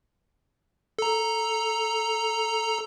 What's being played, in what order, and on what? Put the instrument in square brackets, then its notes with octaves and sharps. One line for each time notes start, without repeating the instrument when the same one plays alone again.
[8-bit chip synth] A4 A#5